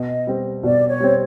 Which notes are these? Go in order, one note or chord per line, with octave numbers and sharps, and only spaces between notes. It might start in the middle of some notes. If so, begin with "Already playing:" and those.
Already playing: B2 D#5
G3 C4
B2 D5
C#5
G3 C4